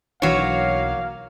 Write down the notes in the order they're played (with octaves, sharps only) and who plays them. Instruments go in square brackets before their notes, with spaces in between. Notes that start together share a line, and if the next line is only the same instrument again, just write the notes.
[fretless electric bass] B1 E3 D4 [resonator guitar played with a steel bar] F#3 C#5 [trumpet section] A#3 F5